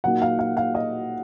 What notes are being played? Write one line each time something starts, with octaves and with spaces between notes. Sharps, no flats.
A#2 F#3 A#3 D#4 F#5
F5
F5
F5
D#5